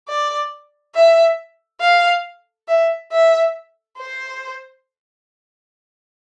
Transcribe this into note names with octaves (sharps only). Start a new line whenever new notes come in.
D5
E5
F5
E5
E5
C5